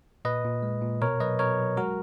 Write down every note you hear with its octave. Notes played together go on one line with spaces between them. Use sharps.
A#2 B4 D#5
A#2
G#3
A#2
B2 A#4 C#5
F#3 B4 D#5
B2 A#4 C#5
F#3
G#3 F#4 A#4